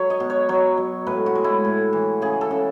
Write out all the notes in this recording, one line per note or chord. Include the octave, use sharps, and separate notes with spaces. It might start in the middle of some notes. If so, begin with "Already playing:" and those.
Already playing: F#3 C#5
D#5
B2
C#5
F#3 C#5
F#3
A2 B4
F#4
G#3
E4
A2
E3
C#3 G#4
A4
C#3